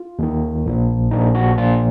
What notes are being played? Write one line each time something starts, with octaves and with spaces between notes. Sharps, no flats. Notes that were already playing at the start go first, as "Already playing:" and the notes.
Already playing: F4
D#2 D#3
A#1 A#2 F3
A#1 A#2 F3 D#4
F#4
A#1 A#2 F3 F4